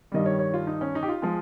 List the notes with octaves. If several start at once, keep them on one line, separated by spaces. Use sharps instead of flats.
G2 D#3 G3 D#5
C#5
C#5
F4
D#4
C#4
D#4
G4
F4
F3 G#3